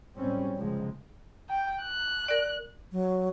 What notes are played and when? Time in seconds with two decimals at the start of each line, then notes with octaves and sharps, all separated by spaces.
0.17 B1 A2 G3 C4 C#4
0.55 G1 C#2 C3 F3 G#3
1.49 G5
1.82 F#6
2.28 A#4 D5
2.92 F#3